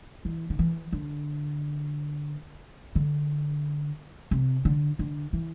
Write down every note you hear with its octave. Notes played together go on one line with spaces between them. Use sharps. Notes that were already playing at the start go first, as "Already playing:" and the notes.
E3
D3
E3
D3
D3
C3
D3
D3
E3